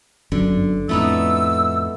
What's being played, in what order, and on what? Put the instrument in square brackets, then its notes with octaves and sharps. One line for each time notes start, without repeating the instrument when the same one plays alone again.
[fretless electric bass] G1 F#2 [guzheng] D3
[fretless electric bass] F2 A2 [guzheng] A3 B3 D#4 [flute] E6